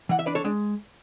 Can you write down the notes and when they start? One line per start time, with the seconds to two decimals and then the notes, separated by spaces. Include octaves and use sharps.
0.09 E3 F#5
0.19 E5
0.26 D4 B4 D5
0.35 A4 C#5
0.44 G#3 D4